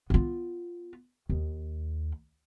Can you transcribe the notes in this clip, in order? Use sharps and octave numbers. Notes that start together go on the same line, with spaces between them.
B3 F4
D#2